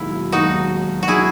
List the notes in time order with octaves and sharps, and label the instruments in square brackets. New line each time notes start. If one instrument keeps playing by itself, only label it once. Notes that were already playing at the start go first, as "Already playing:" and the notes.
Already playing: [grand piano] E1 D#2 D#3 F#3 [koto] E4
[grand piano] E1 D#2 D#3 F#3 [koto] D#4 F#4
[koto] F#4
[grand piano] D#3 F#3 [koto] E4 G#4